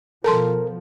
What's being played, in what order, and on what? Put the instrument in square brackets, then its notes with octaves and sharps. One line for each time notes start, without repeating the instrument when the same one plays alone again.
[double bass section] B2 F3 [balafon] A4 A5 C6 [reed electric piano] A#4